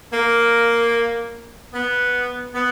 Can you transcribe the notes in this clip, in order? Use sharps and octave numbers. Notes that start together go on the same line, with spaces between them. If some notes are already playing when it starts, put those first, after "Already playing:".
A#3
B3
B3